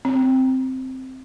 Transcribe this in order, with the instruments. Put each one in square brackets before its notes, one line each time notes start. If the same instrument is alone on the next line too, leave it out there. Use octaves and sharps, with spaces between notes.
[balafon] C4